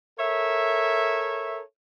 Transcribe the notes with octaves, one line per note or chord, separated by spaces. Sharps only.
A4 A#4 C#5 E5